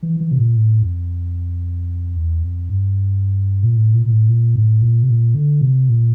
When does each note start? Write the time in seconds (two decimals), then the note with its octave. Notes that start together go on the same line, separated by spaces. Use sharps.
0.03 E3
0.20 E3
0.31 C3
0.39 A#2
0.56 A2
0.82 F2
2.16 E2
2.42 F2
2.69 G2
3.63 A#2
3.76 A2
3.94 A#2
4.06 A#2
4.11 A2
4.29 A#2
4.56 A2
4.82 A#2
5.03 C3
5.09 A#2
5.35 D3
5.61 C3
5.89 A#2